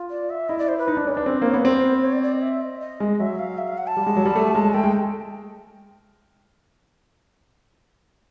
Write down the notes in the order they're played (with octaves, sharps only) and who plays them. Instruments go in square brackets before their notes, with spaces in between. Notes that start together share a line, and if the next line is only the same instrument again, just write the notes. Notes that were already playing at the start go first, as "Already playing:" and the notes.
Already playing: [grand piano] F4
[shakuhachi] D5
E5
[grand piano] E4 [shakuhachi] D#5
[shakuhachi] D5
C5
B4
[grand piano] D#4
D4
C#4
D4
[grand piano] C4 [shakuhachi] C5
[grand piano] A#3 [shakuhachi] C#5
[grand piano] B3
[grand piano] C4 [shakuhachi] C5
[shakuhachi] C#5
D5
D5
D#5
E5
D#5
D#5
[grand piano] G#3
[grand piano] F#3 [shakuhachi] E5
[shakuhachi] F5
E5
F5
F#5
A5
[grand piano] G3
G#3
F#3
G3
A3
G#3
[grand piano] A3 [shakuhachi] G5
[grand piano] G#3